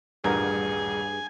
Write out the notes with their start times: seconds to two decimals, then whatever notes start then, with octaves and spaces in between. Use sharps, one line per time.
0.24 D#1 A1 G2 G#4 A#4 G#5